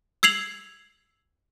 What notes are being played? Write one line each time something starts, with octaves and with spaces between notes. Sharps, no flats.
E6 G#6 C7 F7 F#7